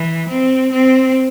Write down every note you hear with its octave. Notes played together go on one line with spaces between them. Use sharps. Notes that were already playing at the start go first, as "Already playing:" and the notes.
Already playing: E3
C4
C4